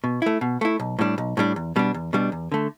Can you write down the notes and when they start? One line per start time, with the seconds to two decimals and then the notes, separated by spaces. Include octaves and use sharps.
0.04 B2
0.22 A3 E4
0.41 B2
0.61 A3 E4
0.80 B1
0.99 A2 G3 D4
1.18 B1
1.37 A2 G3 D4
1.56 E2
1.76 B2 G3 D4
1.94 E2
2.13 B2 G3 D4
2.32 E2
2.52 D3 A3